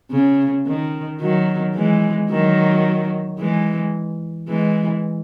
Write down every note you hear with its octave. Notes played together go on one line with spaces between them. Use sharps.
C#3
D#3
D#3 F#3
E3 G#3
D#3 F#3
E3 G#3
E3 G#3